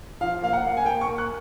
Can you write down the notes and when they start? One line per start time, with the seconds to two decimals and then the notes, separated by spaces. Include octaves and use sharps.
0.21 F3 F5
0.42 A#3 F5
0.53 F#5
0.64 A#3
0.77 G#5
0.85 A#3 G5
1.01 C#6
1.08 A#3
1.18 F#6